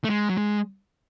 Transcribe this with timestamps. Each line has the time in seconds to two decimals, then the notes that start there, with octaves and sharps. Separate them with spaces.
0.04 A3
0.10 G#3
0.30 F#3
0.37 G#3